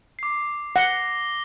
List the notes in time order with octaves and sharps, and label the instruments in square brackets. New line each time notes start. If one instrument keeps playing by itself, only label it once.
[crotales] D6 C7
[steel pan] F#5 [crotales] A#6 G7